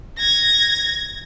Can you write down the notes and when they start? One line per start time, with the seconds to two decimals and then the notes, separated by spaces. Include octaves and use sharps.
0.18 G#6 A#6